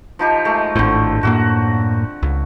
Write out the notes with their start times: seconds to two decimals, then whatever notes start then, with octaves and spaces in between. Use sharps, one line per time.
0.19 F3 D#4 G4
0.45 G#3 A3
0.76 G#1 A2 D3 C4
1.23 F#2 A2 A#3 F#4
2.23 C#2